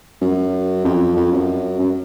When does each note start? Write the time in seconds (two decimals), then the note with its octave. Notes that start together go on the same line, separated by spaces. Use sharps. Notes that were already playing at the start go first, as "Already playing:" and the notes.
0.21 F#2
0.85 F2
1.16 F2
1.32 F#2
1.79 F#2